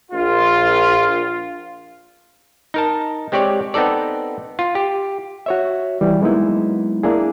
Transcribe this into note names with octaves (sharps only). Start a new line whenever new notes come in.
A#1 F4
D#4 A#4 A5
G#3 C4 G4 C#5 D5
B3 C4 D#4 A4 D5
F4
G4
F#4 C#5 E5
E3 G3
F#3 G#3 A#3 B3 D#4 E4
A#3 D4 E4 G#4